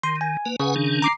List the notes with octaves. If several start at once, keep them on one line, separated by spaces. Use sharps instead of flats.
D#3 C6
G#5
A#3 B4
C#3 B4 F#5 G#5
D#3 C#4 D4
A#5 D6 C7